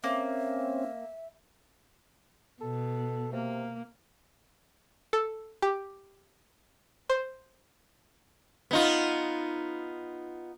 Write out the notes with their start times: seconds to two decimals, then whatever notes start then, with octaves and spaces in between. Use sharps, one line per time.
0.04 A#3 C4 C#4 E5
2.61 B2 A4
3.33 C3 A#3
5.13 A4
5.62 G4
7.10 C5
8.71 B3 D#4 F4